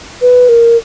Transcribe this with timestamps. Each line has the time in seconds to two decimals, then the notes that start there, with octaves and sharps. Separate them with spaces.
0.22 B4
0.49 A#4